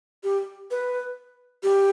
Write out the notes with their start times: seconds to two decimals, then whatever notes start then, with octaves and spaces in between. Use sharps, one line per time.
0.24 G4
0.71 B4
1.63 G4